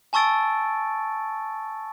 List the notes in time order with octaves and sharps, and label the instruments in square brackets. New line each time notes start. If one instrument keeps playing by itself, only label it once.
[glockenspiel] G#5 A5 C#6 E6 A6 D7